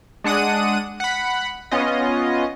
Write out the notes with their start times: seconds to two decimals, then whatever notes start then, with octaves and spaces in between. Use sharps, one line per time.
0.24 G#3 D4 F#5 D#6 D#7
1.00 F#5 B5
1.71 B3 C#4 F4 D#5